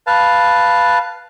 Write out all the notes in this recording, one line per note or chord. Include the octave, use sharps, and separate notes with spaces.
B4 F5 A5